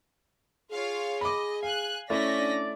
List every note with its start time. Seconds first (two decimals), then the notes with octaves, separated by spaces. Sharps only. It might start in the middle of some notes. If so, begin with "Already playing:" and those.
0.71 F4 G#4 C#5 F5
1.21 D#5 B5 D6
1.63 F5 G#5 F#6
2.10 A3 C#4 E4 D5 A#6 B6
2.39 D4